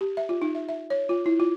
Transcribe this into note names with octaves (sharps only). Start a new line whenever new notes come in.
G4
E5
F4
D#4
E5
E5
C#5
F4
E4
F4